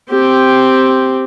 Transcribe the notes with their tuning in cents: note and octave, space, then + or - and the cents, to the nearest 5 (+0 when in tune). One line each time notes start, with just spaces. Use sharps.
C4 +0 G4 +0